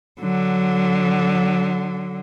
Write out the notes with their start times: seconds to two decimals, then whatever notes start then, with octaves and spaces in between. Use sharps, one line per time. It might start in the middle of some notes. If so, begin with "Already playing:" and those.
0.19 D3 F#3